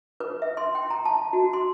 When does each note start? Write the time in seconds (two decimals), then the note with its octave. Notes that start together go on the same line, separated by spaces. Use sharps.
0.20 B4
0.42 E5
0.57 C6
0.75 G5
0.90 A#5
1.05 A5
1.33 F#4
1.53 C6